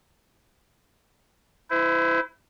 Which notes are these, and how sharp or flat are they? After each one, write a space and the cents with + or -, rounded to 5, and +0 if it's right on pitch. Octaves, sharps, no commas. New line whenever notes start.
E4 +0 C5 -45